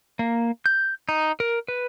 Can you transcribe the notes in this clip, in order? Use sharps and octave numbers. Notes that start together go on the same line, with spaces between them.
A#3
G6
D#4
A#4
B4